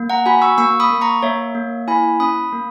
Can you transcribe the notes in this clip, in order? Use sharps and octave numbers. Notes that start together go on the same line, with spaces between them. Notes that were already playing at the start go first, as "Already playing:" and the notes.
Already playing: A#3
F#5 A#5
F#4 G#5 B5
C#6 E6
A#3 C#6 E6
B5 D#6
A#3
A#5 C#6
A#3 C#5 E5
A#3
E4 G#5 B5
C#4 B5 D#6
A#3